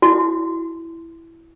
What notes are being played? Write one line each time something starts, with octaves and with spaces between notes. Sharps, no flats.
E4 F#4